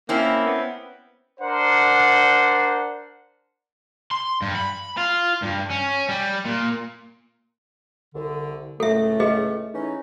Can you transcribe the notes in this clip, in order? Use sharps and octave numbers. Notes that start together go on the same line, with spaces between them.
A#3 C4 C#4 E4
B3
D4 A#4 C5 F#5
C6
G2
B5
F4
G2
C#4
G3
A#2
C2 D3
C#2 A2 A3 A4 E5
G#4 B4 D#5
E3 C#4 D#4